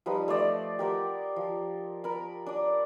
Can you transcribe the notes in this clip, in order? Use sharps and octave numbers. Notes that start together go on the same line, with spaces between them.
F3 G3 D#4 B4
A3 C5 D5 D#5
G4 A#4 C5 F#5
F3
A#4 B5
D4 D5